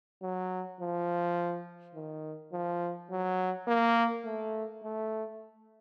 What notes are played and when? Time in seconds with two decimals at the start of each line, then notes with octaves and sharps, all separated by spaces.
0.22 F#3
0.81 F3
1.95 D#3
2.53 F3
3.11 F#3
3.68 A#3
4.25 A3
4.84 A3